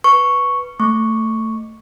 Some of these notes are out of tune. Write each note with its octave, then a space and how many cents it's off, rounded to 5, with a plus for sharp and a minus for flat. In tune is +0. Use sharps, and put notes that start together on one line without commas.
B4 +0 C#6 +0
A3 +15 C#6 +0